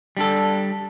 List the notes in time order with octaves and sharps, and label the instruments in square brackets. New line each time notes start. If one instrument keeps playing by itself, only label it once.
[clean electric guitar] G3 D4 A4